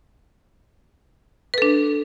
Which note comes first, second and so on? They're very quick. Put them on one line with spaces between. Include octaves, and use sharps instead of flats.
B4 A4 D4